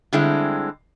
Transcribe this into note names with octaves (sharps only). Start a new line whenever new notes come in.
D3 G3 G#3 C4 D4 E4